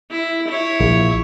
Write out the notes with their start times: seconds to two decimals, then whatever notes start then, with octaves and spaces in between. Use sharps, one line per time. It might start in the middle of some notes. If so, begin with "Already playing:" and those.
0.11 E4
0.48 E4 C#5
0.80 A#1